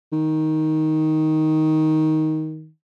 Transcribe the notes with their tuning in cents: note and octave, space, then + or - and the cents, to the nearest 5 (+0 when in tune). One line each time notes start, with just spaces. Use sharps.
D#3 +10